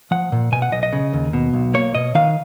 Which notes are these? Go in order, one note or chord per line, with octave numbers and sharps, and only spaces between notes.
F3 F#5
A#2
B2 G#5
F#5
B1 D#5
D#5
C#3
D#2
B2
B1
A#3 C#5
B2 D#5
D#3 F5